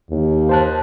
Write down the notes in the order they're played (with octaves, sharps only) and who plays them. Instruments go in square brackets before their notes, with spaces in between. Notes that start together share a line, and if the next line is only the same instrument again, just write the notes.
[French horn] D#2
[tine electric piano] C5 A5 F#6